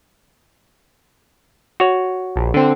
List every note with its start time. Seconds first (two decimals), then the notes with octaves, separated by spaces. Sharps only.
1.80 F#4 C#5
2.36 A#1
2.54 D3 C4